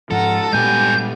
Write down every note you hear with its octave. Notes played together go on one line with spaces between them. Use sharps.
G#2 F3 F4 A4 F#5 A#5
G2 A#2 G3 G#3 B3 G4 G#5 G6